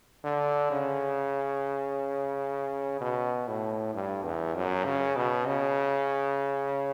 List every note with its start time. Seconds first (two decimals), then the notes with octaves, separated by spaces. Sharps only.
0.24 D3
0.71 C#3
3.01 B2
3.48 A2
3.94 G2
4.23 E2
4.55 F#2
4.85 C#3
5.16 B2
5.47 C#3